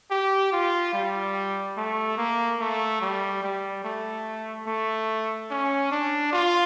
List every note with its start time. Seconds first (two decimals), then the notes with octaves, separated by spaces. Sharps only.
0.11 G4
0.52 F4
0.93 G3
1.77 A3
2.18 A#3
2.59 A3
3.01 G3
3.43 G3
3.84 A3
4.67 A3
5.50 C#4
5.91 D4
6.33 F4